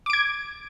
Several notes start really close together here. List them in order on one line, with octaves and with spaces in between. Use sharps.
D6 D7 G#6